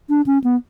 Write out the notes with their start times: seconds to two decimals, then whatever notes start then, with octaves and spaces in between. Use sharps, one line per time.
0.09 D4
0.26 C#4
0.44 B3